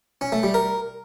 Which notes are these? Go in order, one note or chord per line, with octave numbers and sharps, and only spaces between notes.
C#4
A3
G3
A#4